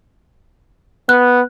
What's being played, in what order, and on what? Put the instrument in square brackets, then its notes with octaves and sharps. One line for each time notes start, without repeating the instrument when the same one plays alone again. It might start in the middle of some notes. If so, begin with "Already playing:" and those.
[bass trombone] B3 [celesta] F#6